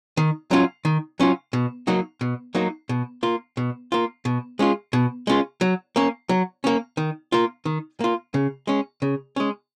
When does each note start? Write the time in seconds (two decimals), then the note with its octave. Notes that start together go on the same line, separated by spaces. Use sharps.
0.17 D#3
0.51 F#3 C#4 F4
0.85 D#3
1.20 F#3 C#4 F4
1.53 B2
1.87 F#3 A#3 D#4 F#4
2.21 B2
2.55 F#3 A#3 D#4 F#4
2.89 B2
3.23 A#3 F4
3.57 B2
3.92 A#3 F4
4.25 B2
4.59 G#3 C#4 F4
4.93 B2
5.27 G#3 C#4 F4
5.61 F#3
5.96 A#3 C#4
6.29 F#3
6.64 A#3 C#4
6.97 D#3
7.32 A#3 F4
7.65 D#3
8.00 A#3 F4
8.34 C#3
8.67 G#3 C#4
9.02 C#3
9.36 G#3 C#4